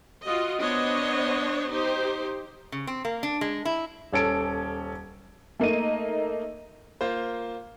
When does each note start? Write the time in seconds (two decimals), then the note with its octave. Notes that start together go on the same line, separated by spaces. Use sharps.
0.23 F4 F#4 D#5
0.61 B3 D4 C5 C#5 D#5
1.69 D#4 G4 C5
2.72 C#3
2.87 C4
3.05 A#3
3.23 D4
3.41 G#3
3.65 E4
4.12 D#1 C#4 A4 D7
5.60 A3 A#3 D#4 D#7
7.01 A#3 F4 C5